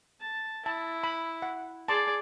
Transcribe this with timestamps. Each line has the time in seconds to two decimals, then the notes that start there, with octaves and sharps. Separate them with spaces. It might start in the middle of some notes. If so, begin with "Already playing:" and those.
0.21 A5
0.66 E4 A5
1.04 B5
1.42 F#5
1.88 G#4 D5 A5 C6